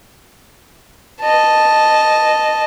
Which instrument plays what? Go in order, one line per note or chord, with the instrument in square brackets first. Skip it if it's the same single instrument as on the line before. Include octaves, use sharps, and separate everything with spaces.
[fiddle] D#5 A5